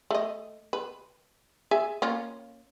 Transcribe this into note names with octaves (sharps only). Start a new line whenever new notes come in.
A3 D#5
B4
G#4 E5 G#5
A#3 C#4 F4